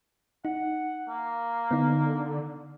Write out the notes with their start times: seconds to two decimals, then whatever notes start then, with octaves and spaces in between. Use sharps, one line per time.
0.45 D#4 F#5
1.08 A#3
1.71 D3 B3 D#4